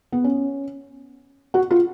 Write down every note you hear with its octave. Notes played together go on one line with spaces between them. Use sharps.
B3
C#4
F#4
F4